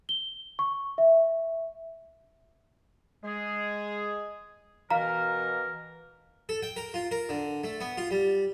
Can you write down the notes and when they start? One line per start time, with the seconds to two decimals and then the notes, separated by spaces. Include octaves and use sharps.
0.09 G7
0.59 C#6
0.98 E5
3.24 G#3 G#4
4.90 B2 E3 A#4 F5 A#5
6.49 A4
6.63 G5
6.76 A#4
6.94 F4
7.11 A#4
7.29 D3
7.64 A3
7.80 B3
7.97 F4
8.11 G3